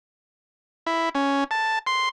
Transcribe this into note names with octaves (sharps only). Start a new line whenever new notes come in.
E4
C#4
A5
C6